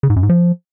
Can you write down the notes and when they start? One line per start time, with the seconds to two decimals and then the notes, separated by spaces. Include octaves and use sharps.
0.03 C#3
0.10 G#2
0.16 F#2
0.23 G#2
0.29 F3